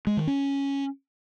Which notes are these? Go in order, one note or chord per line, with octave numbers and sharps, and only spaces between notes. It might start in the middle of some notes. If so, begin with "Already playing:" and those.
G#3
D#3
C#4